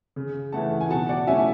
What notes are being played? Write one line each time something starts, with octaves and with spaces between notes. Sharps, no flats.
C#3
E3 A3 F#5 A5
G#5
B2 F#5 A5
D5 F#5
F#3 A3 C#4 E4 E5 G#5